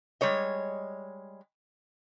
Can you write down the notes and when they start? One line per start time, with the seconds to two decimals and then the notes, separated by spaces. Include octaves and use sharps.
0.21 G3 G#3 C#5 D#5